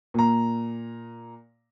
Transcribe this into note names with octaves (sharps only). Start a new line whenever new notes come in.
A#2 A#5